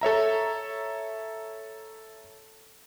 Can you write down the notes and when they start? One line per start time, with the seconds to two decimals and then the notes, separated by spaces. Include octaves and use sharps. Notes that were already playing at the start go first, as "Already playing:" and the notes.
0.01 A4 C#5 E5 A#5